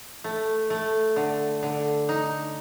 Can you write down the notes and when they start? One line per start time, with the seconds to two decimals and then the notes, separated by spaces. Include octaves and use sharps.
0.24 A3
0.70 A3
1.16 D3
1.63 D3
2.09 D#4